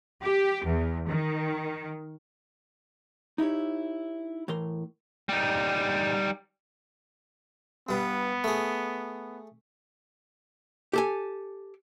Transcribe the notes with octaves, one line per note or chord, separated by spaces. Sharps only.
G4
E2
D#3
D#4 E4 G4 C#5
A2 E3 A#4 C6
G3 D#4
G2 G3 B3
A3 G#4
G4 A4 G#5